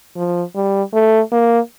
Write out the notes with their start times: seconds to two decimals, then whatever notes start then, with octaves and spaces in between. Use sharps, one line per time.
0.16 F3
0.56 G3
0.93 A3
1.32 A#3